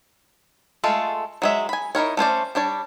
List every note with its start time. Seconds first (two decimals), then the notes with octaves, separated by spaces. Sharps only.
0.84 G#3 A3 F4 A4
1.42 F#3 G#3 E5
1.69 G#5 B5
1.95 D#4 E4 A#4 C#5
2.17 A3 C#4 C5 D5
2.55 G3 D4 C#5 D5